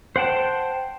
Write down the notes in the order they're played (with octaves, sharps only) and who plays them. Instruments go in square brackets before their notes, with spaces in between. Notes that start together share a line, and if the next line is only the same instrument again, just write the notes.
[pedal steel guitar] C5 F#5 G5 A5